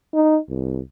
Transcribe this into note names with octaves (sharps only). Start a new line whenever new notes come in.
D#4
C2